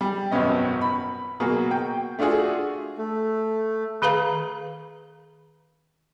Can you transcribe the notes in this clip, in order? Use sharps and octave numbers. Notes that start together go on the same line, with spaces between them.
G3
G#1 F#2 B2 B3 C#4 D#5
B5
B2 F#3 A#3 F#4 G#4
G5
A3 D4 F4 F#4 G#4
A3
D#3 G#4 B4 F5 A#5